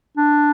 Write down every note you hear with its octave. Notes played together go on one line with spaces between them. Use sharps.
D4